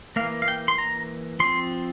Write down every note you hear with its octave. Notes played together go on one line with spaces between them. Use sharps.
E3 A#3 F5
F5
G5
C6
A#5
F3 C4 C6